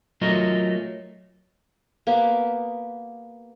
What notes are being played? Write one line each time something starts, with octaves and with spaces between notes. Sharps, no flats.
F#3 A3 F4 A#4 C#5 D#5
A#3 B3 G4